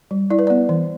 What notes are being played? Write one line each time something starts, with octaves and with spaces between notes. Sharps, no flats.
G3
E4 D5
B4
B3 D5
E3